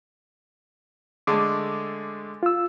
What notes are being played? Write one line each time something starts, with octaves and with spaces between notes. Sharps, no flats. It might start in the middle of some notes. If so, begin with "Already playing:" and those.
D3 G#3 A3 D6
F4 E6